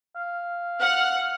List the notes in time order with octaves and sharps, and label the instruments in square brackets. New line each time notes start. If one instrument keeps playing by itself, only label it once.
[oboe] F5
[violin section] F#5 [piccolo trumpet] F6